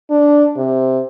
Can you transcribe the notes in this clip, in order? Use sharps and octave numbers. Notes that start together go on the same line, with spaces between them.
D4
C3